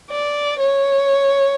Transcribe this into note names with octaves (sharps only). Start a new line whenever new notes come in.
D5
C#5